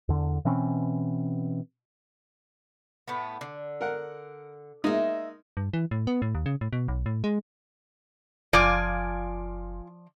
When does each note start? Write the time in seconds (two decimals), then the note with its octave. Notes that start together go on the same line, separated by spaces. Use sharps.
0.09 E2 D3
0.45 B2 E3 C4 C#4
3.08 A2 A3 B3
3.41 D3
3.81 A#4 F#5
4.84 G#3 A#3 D#4 D#5 E5
5.57 G2
5.73 E3
5.91 A2
6.07 B3
6.22 A2
6.35 D#2
6.46 C#3
6.61 A2
6.73 B2
6.88 B1
7.06 A2
7.24 G#3
8.53 F#1 F3 F4 D5 G#5 D6